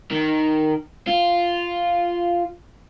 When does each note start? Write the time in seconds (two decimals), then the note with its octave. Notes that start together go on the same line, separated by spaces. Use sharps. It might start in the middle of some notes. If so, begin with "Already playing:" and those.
0.11 D#3
1.07 F4